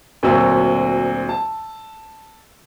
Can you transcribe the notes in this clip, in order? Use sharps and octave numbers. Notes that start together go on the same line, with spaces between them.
D2 A#2 F#3 C4 E6
A5